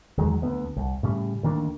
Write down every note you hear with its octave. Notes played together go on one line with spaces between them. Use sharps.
E2 D#3 F#3 G#3
D2 B3
C2
A2 C#3 G3
D2 D#3 A#3 D4